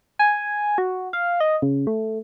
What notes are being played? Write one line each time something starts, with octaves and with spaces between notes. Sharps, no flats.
G#5
F#4
F5
D#5
C#3
A3